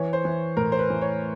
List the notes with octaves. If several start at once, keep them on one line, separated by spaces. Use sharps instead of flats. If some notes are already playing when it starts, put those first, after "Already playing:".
Already playing: E3 C#5
C5
E3
A2 A#4
C5
B4
E3
C#5